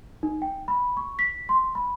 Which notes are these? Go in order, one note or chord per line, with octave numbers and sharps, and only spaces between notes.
D#4
G5
B5
C#6
B6
C6
B5